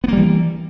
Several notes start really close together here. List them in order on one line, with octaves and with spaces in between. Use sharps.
B3 A#3 G3 E3